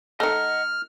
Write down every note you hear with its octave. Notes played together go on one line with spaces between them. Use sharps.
A3 D#4 D#5 F#5 F6